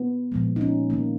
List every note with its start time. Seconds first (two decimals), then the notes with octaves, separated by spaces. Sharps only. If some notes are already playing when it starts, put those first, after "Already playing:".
Already playing: B3
0.32 A#2 F3 G#3
0.56 D#4
0.61 C#4
0.90 D#3 A#3